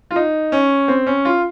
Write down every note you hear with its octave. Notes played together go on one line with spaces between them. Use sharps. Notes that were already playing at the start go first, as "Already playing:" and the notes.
F4
D#4
C#4
C4
C#4
F4